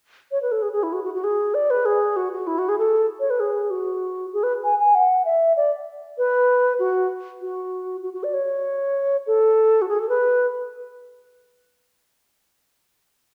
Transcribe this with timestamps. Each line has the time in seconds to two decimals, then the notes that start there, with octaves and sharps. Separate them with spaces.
0.31 C#5
0.42 B4
0.52 A4
0.62 G#4
0.72 G#4
0.83 E4
0.93 F#4
1.04 F#4
1.14 F#4
1.24 G#4
1.54 D5
1.70 B4
1.85 G#4
2.16 F#4
2.33 F#4
2.47 E4
2.58 F#4
2.69 G#4
2.78 A4
3.20 C#5
3.30 B4
3.40 G#4
3.71 F#4
4.33 G#4
4.43 B4
4.64 G#5
4.79 G#5
4.95 F#5
5.25 E5
5.57 D5
6.18 B4
6.79 F#4
7.41 F#4
8.03 F#4
8.13 F#4
8.24 D5
8.34 C#5
9.27 A4
9.82 F#4
9.89 G#4
9.99 A4
10.09 B4